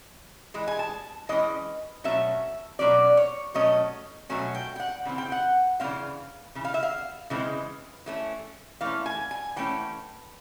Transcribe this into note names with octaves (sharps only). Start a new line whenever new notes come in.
E3 G#3
G#5
A5
E3 G#3 C#4 D#5
B2 F#3 A3 C#4 E5
B2 F#3 A3 C#4 D5
C#5
B2 F#3 A3 C#4 D#5
B2 F#3 A3 C#4 G#5
G5
G5
F#5
C#3 E3 C4
G5
F#5
C#3 E3 G#3 C4 F5
C#3 E3
F5
E5
F5
C#3 E3 G#3 C4
E3 A3 C#4
E3 A3 C#4 F5
G#5
G#5
E3 A3 C#4 G5